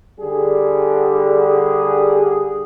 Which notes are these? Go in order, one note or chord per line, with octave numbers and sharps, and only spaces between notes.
D3 G3 G#4
G#4